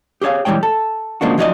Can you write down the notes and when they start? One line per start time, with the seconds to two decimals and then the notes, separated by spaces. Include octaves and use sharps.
0.21 G4 G#4 C5 C#5 F5
0.45 B1 E3 G3 G#3 C#5 G5
0.63 A4
1.21 C#3 F3 G#3 A#3 D4 F#4
1.38 F3 F#3 D#4 G4 D5 D#5